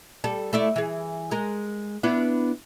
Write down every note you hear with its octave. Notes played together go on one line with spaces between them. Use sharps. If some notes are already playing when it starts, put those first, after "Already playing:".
G3 A4
A3 E4 D5
E3 G#4
G#3 A#4
B3 D4 E4